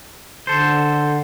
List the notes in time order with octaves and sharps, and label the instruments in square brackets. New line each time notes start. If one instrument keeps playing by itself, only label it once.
[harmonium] D3 [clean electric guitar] A4 C5